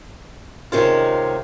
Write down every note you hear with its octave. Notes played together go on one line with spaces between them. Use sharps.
C3 D#3 G#3 C#4 F4